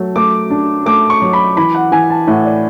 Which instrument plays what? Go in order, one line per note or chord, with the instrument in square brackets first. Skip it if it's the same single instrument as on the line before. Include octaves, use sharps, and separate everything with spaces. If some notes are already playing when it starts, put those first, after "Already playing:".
Already playing: [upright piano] F#3 A3
[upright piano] A3 [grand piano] D6
[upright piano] D4
[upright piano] A3 [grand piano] D6
[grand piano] C#6
[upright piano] F#3
[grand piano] B5
[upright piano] E3 [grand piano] B5
[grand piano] F#5
[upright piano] E3 [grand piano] G#5
[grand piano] A5
[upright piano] A2 [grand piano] F#5
[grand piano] D5